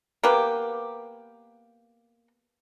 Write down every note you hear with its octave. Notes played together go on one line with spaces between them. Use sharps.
A#3 B3 G4